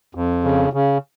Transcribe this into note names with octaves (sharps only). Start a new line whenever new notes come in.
F2
C#3
C#3